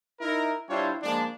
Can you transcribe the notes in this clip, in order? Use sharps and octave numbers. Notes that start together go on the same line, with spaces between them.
D#4 E4 A#4
G3 D4 E4 F4 C5 C#5
F3 G#3 A#3 D4